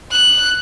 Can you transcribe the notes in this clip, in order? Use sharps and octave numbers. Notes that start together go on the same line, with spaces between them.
F#6